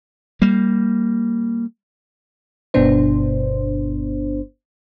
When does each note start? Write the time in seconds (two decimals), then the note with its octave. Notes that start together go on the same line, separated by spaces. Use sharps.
0.42 G3 A#3
2.74 G1 G2 B2 B3 D4 C5